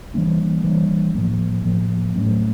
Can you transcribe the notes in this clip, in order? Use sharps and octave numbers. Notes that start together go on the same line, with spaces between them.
E3 G3 A#3 D4
E3 G3 A#3 D4
A2 F3 A#3
A2 F3 A#3
A2 F#3 A3 C#4